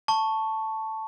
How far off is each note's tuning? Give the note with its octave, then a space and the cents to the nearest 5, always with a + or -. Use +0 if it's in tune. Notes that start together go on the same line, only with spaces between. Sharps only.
A5 +0 C#6 +0